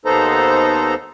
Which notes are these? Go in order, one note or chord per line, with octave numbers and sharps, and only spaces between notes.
D#2 B3 D#4 A4 C5 A#5